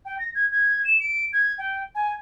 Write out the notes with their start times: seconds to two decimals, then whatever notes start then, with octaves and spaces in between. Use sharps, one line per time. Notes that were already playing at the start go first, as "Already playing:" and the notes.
0.05 G5
0.19 A#6
0.35 G#6
0.52 G#6
0.85 E7
1.00 D7
1.33 G#6
1.58 G5
1.95 G#5